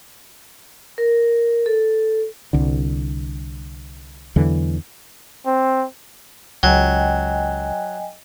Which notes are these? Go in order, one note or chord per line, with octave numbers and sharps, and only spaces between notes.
A#4
A4
C2 D3
E2 D3 E3 F#3
C4
C#2 F#3 D#5 G5 G#5